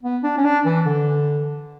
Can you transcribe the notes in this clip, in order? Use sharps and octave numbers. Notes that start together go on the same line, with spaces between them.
B3
D4
C#4
D4
E3
D3